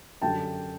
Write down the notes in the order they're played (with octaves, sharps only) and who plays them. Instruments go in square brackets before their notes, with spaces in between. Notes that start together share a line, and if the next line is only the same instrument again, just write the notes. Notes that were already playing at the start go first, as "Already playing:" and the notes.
[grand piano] F#2 D3 G3 G5 A5